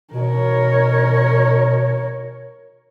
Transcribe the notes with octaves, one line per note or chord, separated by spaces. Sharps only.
B2 A#4 C#5